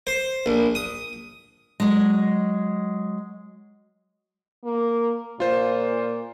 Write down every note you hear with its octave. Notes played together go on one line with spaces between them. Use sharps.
C5
A#1
D#6
F#3 G#3
A#3
A#2 F4 C5